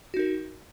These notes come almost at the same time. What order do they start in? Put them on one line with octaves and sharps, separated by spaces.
F#4 D#4 A#4